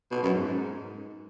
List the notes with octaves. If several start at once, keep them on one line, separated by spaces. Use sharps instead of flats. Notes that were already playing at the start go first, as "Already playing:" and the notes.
B2
F#2
G#2